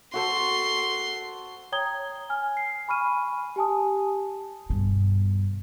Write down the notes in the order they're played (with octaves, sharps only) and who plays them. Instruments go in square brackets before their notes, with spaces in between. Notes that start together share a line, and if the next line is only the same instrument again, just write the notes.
[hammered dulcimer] F#4 A4 C5 [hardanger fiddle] C6
[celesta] C#5 G5 A#5 D#6 G#6 G7
G#5 F6
C7
G#5 B5 C#6 F6 D#7
G4 G#5 A5 D#6
[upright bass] G2 B2